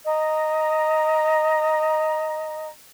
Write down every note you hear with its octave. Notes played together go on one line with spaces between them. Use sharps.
D#5 A#5